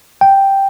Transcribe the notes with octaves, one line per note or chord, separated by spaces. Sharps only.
G5